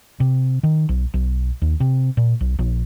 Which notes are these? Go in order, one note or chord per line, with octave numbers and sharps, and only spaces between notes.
C3
D#3
B1
B1
D#2
C3
A#2
B1
A#1